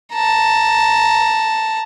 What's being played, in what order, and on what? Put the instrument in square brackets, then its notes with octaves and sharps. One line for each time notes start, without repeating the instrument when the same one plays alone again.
[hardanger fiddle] A5 A#5